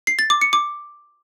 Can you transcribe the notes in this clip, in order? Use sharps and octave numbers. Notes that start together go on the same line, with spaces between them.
C7
A6
D6
C#7
D6